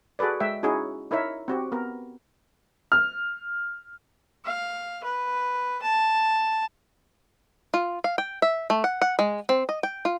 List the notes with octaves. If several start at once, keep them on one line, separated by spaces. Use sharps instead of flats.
F#4 G#4 A4 B4 D5
G#3 E5 G5
C#4 D#4 E4 F#4 G#4
D#4 E4 A#4 C#5 E5
C4 F#4 G4
B3 A#4
F6
F5
B4
A5
F4
F5
G5
E5
A3
F#5
F#5
G#3
C4
D#5
G5
F4